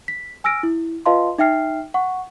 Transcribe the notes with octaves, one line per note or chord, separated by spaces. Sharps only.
B6
G#5 E6 F6 A#6 D7
E4
F4 B4 D#5 F5 A5 C6
D#4 E5 G5 F6 C7
F#5 C#6